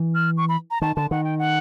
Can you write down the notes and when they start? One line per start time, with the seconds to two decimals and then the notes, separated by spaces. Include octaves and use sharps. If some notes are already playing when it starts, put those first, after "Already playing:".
Already playing: E3
0.15 F6
0.37 C#6
0.49 B5
0.71 A#5
0.81 D#3 A5
0.96 D3 A5
1.11 D#3 F#5
1.24 G5
1.38 F#5